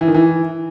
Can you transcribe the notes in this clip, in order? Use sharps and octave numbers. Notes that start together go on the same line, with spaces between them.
E3
D#3
E3